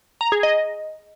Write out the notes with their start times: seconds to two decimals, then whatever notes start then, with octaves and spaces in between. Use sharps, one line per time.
0.21 A#5
0.32 G#4
0.43 D#5